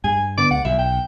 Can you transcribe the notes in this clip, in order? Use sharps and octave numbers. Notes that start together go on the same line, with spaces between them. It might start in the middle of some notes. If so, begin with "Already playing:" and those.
G2 G#5
D3 B3 D6
C#2 F#5
B1 E5
G5